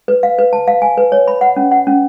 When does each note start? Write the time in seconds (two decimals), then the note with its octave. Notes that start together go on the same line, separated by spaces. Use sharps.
0.08 B4
0.23 F5
0.38 B4
0.53 A5
0.68 F5
0.82 G#5
0.98 B4
1.12 C#5
1.28 B5
1.41 F#5
1.56 C#4
1.72 F#5
1.87 C#4